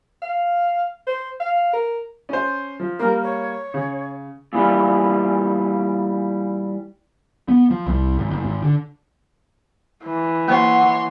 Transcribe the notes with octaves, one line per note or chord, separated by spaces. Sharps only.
F5
C5
F5
A#4
C#4 C5
F3
G3 A#3 A#4
C#5
C#3
A#2 E3 G3
B3
F3
C2
G#1
F#1
G#1
D3
E3
A#3 C5 C#5 F#5 C6 C#6